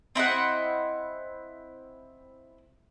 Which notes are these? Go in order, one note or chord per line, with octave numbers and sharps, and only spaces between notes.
C4 E4 D#5 F#5